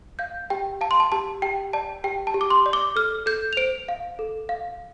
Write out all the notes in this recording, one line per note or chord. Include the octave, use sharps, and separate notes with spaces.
F5 G6
G4 G5
F5 A5
C6
A5
G4 A5
G4 G5
D5 A5
G4 G5
A5
G4
D6
C6
D5
D6
A4 F6
A4 G6
F7
C5 D7
F5
A4
F5